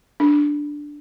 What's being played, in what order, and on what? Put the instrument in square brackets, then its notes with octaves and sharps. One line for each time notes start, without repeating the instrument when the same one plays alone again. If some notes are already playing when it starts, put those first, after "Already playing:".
[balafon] D4